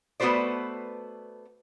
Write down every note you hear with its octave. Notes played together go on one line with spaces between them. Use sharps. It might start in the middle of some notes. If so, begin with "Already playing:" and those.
A3 B3 F#4 B4 C5 D5